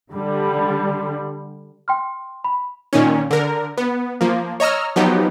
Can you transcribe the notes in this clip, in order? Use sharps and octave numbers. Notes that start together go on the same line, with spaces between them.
D3 G3
G5 C6 F6
B5
A#2 D#3 C#4
D3 A#4
B3
F3 A#3
C#5 D#5 A#5 E6 F6
F3 F#3 B3 D#4 G4